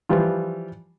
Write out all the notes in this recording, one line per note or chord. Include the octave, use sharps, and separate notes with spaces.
E3 F3 G3 F4